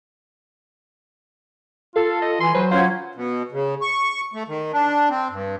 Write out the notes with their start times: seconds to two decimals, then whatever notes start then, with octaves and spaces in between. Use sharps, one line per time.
1.96 F4 A4 F5
2.22 D#5
2.40 E3 G#5 C6
2.55 F#3 B4 C5
2.71 C#4 F4 C5 F#5 G#6
3.15 B2
3.52 C#3
3.82 C#6
4.34 A3
4.48 D#3
4.73 D4
5.10 C4
5.30 G2